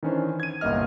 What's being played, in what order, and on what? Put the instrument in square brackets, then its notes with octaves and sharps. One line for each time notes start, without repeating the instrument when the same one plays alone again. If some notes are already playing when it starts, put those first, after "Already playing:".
[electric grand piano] D#3 E3 C#4 D4 C5
G#6 D#7
G1 C2 A#3 D#5 F6